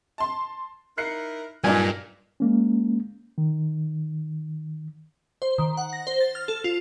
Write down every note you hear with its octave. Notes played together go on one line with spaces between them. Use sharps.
A5 C6
D#4 E4 A#4 F#6 C7 C#7
G2 A#2 F#3 D4 D#4 G#5
G#3 A#3 C#4
D#3
C5
D#3
F#5
A#6
C5
A6
F6
A4
F4